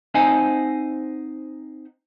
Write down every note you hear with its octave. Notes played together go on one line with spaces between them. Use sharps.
C4 D#4 C5 D#5 F#5 G#5